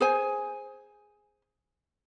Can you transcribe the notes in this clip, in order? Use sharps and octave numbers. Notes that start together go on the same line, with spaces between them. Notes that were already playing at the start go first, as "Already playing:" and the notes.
G#4 C5 G#5